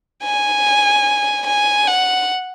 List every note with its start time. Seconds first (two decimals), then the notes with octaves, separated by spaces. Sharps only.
0.24 G#5
1.47 G#5
1.87 F#5